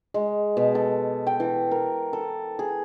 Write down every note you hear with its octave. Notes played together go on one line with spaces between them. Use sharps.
G#3
B2
A4
G5
E3
A#4
A4
G#4